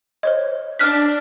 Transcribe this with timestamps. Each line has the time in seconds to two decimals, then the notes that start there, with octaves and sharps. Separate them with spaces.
0.23 C5 C#5 D#5
0.79 D4 F6 F#6 B6